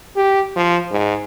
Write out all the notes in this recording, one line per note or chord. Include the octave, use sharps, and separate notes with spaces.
G4
F3
G#2